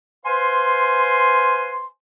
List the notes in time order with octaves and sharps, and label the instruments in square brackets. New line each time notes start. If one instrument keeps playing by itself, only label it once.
[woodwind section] B4 C5 F5 G#5 C6